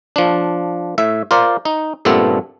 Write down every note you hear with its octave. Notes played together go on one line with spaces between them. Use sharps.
F3 D4
A2 E5
F4 A#4 C5 D5
D#4
G2 A#2 A3 B3 C4 A4